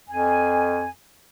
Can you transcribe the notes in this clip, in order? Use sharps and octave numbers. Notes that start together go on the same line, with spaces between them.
F2 G#5